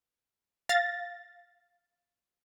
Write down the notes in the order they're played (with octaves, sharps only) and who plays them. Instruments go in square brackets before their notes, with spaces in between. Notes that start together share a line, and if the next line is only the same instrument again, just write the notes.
[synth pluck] F5 A6 A#6